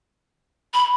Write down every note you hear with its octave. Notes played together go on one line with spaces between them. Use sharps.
B5